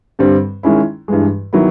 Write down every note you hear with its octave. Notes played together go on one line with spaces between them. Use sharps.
G2 D3 G3 C4
D#3 G#3 C#4 E4
G2 E3 G#3
D#3 F#3 B3 E4